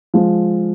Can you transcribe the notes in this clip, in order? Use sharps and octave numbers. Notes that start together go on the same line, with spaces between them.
F3 G#3